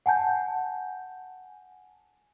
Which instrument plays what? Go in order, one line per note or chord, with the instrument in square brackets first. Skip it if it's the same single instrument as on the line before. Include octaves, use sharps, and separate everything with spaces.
[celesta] F#5 G#5 A5 G6